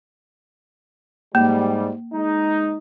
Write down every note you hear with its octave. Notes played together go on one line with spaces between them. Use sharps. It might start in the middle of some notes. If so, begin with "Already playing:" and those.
G#2 G3 A#3
G#3 D#4